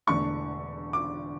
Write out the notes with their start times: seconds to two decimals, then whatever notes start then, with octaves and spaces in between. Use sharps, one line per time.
0.07 E1 E2 D3 A3 D4 C#6
0.93 D6